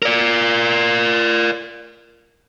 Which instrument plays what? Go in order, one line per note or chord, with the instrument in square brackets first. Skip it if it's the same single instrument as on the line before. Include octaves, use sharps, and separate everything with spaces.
[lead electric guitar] A#4 D5